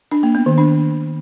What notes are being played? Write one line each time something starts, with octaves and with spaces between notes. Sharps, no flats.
D4
A#3
B3
D#3
D4